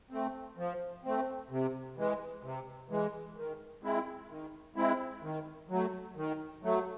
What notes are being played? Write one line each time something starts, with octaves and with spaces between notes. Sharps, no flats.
A3 C4
F3
A3 C4
C3
E3 G#3
C3
E3 G#3
D#3
G#3 C4 E4
D#3
G#3 C4 E4
D#3
F#3 A3
D#3
F#3 A3